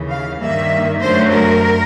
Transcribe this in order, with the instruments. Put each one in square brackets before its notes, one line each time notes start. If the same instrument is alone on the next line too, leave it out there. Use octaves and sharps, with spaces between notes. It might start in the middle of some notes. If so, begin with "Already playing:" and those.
Already playing: [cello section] D#2 C#3 E3
F5
G2 D#3 G3 A#3 E5
F#2 D3 F#3 A3 C5
A#4